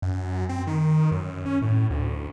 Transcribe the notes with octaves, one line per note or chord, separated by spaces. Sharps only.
F#2
C4
D#3
F#2
C#4
A2
D2